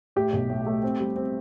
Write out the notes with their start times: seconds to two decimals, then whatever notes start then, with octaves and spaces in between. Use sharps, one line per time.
0.16 A2 G4
0.33 B1
0.50 A2
0.66 A3
0.83 C4
1.00 G3
1.16 C4